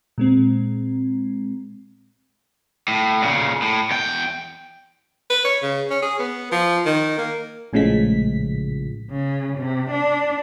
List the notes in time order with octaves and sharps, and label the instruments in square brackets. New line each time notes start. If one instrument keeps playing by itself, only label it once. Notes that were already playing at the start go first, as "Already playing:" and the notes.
[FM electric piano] A#2 G#3 C4
[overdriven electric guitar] A2
A#2 C#3
A2
E2 G5
[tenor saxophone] B4
C#5
C#3
C#4
G#4
B3
F3
D#3
A#3
[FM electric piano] A#1 A2 C#3 F3 G#3 B6
[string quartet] C#3
C3
D4